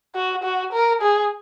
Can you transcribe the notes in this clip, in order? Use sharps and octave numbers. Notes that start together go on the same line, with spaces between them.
F#4
F#4
A#4
G#4